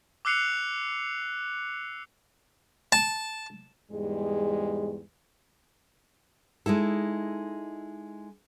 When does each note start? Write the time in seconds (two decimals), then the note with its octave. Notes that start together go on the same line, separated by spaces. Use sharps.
0.25 D6 E6 F#6 C7 C#7 F7
2.92 A5
3.92 E2 G#2 G3 G#3
6.66 G#3 D#4 E4 A4